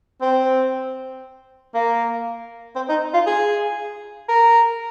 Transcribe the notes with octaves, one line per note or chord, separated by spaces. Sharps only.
C4
A#3
C4
D#4
F4
G#4
A#4